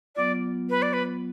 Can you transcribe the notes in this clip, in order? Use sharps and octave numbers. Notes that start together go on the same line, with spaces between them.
F#3 B3 F4 D5
B4
D5
B4